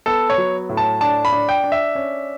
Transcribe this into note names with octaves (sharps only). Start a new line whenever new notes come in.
B3 A4
C#5
F#3
A2
A5
D4 A5
B5
D4
G5
D4
E5
C#4